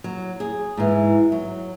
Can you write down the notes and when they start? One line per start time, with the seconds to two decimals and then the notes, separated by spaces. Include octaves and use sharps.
0.04 F#3
0.40 G#4
0.77 G#2 E3
1.32 F#3